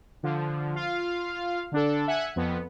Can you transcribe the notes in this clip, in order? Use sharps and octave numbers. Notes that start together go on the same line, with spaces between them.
D3 F3
F4 F5
D3 D4 A4
E5 F#5 G#5 F#6 G#6 C#7
F2 B3